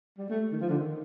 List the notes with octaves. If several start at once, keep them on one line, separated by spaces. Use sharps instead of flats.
G3
A3
D#3
F3
D3
D#3